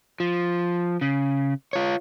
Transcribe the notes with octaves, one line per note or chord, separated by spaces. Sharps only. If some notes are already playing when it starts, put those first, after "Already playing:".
F3
C#3
F4 C#5